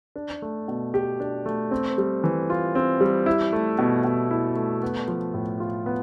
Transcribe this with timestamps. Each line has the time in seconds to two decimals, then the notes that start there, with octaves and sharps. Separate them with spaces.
0.16 D4
0.42 A3
0.68 B2
0.94 G4
1.20 D4
1.46 A3
1.71 C4
1.98 G3
2.24 E3
2.50 F4
2.75 C4
3.01 G3
3.26 E4
3.52 A3
3.78 B2
4.04 B2
4.31 E4
4.56 A3
4.82 B3
5.08 F3
5.34 A2
5.60 F4
5.86 B3